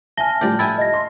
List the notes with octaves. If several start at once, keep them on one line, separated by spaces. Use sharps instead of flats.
E5 G#5 A5 F6 A#6 G7
A2 F3 G3 G4 D5
E4 G5 G#5 A6
D#5 A#6
C6